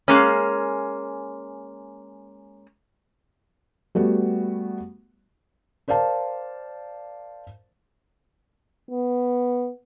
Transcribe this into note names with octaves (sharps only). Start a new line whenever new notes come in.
G#3 A#3 C#4
G3 A3 B3 F#4
A#4 C5 D5 F5 A5
B3